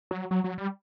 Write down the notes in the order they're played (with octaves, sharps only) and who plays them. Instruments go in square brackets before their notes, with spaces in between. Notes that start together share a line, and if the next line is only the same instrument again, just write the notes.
[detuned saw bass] F#3
F#3
F#3
G3